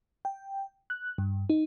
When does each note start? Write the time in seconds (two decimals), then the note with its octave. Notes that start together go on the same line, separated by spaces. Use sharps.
0.25 G5
0.90 F#6
1.18 G2
1.50 D#4